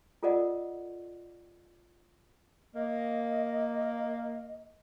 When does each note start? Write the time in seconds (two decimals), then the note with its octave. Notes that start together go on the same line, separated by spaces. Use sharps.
0.23 F4 A4 A#4 D5 D#5 F#5
2.75 A#3 D#5